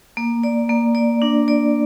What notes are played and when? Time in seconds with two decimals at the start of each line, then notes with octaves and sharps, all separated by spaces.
0.17 A#3
0.44 D5
0.69 A#3
0.95 D5
1.22 D4
1.48 D5